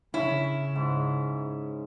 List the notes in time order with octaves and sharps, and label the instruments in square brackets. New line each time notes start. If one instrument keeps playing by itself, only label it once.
[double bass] C#3 [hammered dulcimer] C#4 [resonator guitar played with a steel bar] E4
[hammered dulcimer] G#2